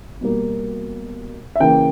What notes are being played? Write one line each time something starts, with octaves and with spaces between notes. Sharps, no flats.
B2 G3 A#3
E5
C#3 E3 A#3 G5